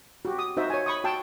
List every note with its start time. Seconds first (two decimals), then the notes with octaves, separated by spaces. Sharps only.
0.25 F#4 G4
0.39 D#6
0.57 D#4 F#4 C5 E5
0.70 C#5 G#5
0.86 B5 C#6 D#6
1.04 F#4 G5 A5